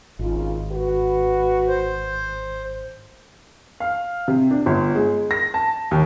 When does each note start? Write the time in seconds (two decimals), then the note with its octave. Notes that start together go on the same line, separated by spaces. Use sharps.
0.19 G#1 C#3 D#4 F4
0.70 F#4 B4
1.68 C5
3.80 F5
4.28 C3
4.51 D4
4.66 G1
4.95 G#3
5.31 A#6
5.54 A5
5.91 D#2